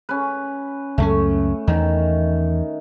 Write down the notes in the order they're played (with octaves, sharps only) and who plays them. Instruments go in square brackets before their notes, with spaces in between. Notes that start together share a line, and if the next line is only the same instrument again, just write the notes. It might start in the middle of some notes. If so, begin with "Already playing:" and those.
[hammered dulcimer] C#4 B4
[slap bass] C#2 F#2 C#4 [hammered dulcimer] A3
[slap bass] E2 [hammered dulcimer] D#3